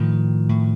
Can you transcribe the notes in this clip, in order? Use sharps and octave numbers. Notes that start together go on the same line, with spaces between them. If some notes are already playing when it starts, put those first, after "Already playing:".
Already playing: A2 D#3 F3
A2